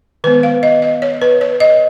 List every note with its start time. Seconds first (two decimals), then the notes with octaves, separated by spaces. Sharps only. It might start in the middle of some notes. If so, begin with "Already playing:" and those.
0.24 D#3 G#3 B3 B4
0.43 F5
0.63 D#5
0.82 D#5
1.02 C#5
1.22 B4
1.41 C#5
1.60 D#5